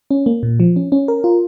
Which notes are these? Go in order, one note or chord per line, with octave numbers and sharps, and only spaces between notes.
C#4
A#3
A#2
F3
C#4
C#4
A#4
F4